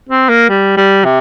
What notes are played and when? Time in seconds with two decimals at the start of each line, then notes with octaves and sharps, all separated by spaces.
0.09 C4
0.29 A#3
0.50 G3
0.77 G3
1.04 C3